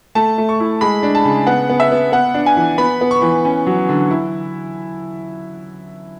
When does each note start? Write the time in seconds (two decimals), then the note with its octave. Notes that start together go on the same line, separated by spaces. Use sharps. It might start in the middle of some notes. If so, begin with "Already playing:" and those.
0.15 A3 A5
0.38 A3
0.49 C#6
0.60 E4
0.81 G#3 B5
1.03 D4
1.15 A5
1.25 C#3
1.47 B3 F#5
1.69 B3
1.80 E5
1.92 B3
2.12 B3 F#5
2.34 D4
2.46 G#5
2.57 E3
2.78 B3 B5
3.01 B3
3.11 C#6
3.22 E3
3.45 C#4
3.67 F#3
3.89 D3
4.11 E4